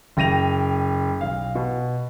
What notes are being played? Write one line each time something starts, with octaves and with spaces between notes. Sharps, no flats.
F#1 G5 A#6 D#7 F7
B1 F5
B2